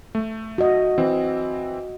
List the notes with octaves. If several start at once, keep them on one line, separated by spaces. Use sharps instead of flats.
A3
F#4 D#5
E3 C4